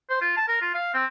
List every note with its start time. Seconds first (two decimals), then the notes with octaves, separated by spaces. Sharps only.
0.09 C5
0.21 F4
0.37 A5
0.48 A#4
0.61 F4
0.74 F5
0.94 C4